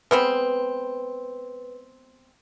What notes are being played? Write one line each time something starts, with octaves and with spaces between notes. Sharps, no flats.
G#3 B3 C4 B4